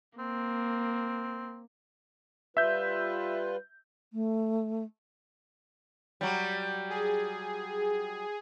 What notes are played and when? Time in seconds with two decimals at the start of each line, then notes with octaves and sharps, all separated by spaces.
0.19 A#3 C4
2.57 G3 F4 B4 E5 G6
4.11 A3
6.21 F#3 G3
6.90 G#4